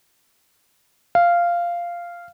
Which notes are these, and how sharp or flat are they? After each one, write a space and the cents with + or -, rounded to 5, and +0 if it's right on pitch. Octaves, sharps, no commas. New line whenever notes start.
F5 -10